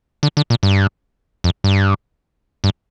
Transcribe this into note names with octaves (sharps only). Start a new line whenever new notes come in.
D3
D3
A#2
G2
F2
G2
G2